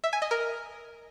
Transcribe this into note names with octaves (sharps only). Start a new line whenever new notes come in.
E5
G#5
D#5
A#4